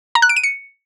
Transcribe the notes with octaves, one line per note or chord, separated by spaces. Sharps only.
A#5
F#6
D7
D#7
C#7